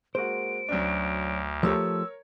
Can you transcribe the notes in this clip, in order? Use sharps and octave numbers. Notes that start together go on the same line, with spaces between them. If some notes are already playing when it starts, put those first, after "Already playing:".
G#3 A#3 F#4 C5 D7
D2 F#3 C#4 D4
F3 A3 G4 A#4 C#5 E6